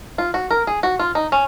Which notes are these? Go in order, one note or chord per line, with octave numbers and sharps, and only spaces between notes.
F4
F#4
A#4
G#4
F#4
F4
D#4
C#4